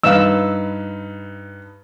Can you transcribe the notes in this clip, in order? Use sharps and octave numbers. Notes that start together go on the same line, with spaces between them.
G2 D#4 B4 F5 E6